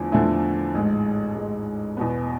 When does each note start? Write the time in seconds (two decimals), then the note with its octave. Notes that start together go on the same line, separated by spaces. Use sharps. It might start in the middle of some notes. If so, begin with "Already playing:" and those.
Already playing: E2 D3 F3 A3 E4
0.12 E2 D3 F3 A3 E4
0.74 A1 G#2 G#3
1.35 A1 G#2 G#3
1.97 E2 B2 B3